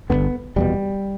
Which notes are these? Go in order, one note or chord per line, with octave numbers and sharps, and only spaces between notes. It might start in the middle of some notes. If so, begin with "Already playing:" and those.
G1 G2 D3 B3
F1 E2 B2 G3